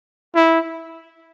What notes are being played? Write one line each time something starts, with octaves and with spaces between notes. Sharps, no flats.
E4